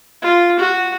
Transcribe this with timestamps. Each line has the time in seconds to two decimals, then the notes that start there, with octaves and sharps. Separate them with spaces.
0.22 F4
0.60 F#4